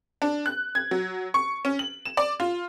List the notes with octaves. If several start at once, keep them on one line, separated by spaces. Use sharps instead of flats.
D4
F#6
G#6
F#3
C#6
C#4
F#7
E7
D5
F4